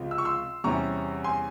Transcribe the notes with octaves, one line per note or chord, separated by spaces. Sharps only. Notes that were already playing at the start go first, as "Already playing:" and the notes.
Already playing: C#2 C3 F3
E6
C#6
C6 E6
E2 C3 G3 C#4 E4 A#5 C#6
G#5 C6